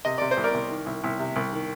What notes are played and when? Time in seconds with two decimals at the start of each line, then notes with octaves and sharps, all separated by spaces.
0.05 C3 D#5
0.18 C3 D5
0.31 C5
0.37 C2
0.44 A#4 D5
0.54 C2
0.70 D#3
0.86 C2
1.04 C2
1.19 C3
1.36 C2
1.52 D#3